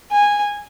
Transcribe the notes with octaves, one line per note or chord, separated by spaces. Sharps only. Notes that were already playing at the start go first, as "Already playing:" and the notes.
G#5